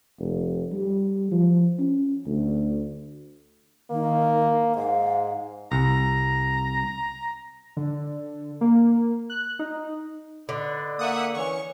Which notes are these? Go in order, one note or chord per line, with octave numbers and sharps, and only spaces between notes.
F1
G3
F3
C#4
D2
D#3 A#3
G#2 F5
C2 A#5
D3
A#3
F#6
D#4
D3 B4 D5 D#5
A#3 E5 F#5 D#6
E3 C#4 C#5 C#6